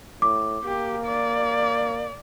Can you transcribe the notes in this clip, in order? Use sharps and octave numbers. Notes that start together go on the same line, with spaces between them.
A2 D6
A#3 G4
D5